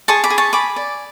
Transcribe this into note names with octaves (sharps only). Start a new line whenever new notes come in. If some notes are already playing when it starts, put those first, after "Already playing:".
G#4 A5 C#6
B5 D6
G#4
A5 C#6
G#4 B5 D6
D5